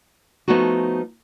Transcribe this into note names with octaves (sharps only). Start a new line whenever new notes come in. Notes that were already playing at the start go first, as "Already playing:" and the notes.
F3 G3 A3 B3 D#4 F#4